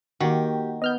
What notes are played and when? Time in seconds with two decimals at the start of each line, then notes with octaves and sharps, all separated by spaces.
0.20 D#3 A#3 F#4 G4
0.82 B3 D#5 F6 G6